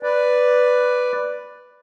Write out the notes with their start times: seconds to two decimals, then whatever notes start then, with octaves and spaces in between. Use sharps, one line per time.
0.03 B4 D5